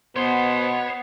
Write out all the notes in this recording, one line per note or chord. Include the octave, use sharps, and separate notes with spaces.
B2 B3 C5 C#5 C6